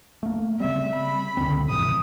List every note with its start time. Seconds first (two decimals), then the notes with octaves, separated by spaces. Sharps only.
0.23 A3 A#3
0.60 C#3 G3 C4 E5
0.96 B5
1.37 E1 C#2 D3 C4
1.70 C2 G#2 C3 E3 F3 D#6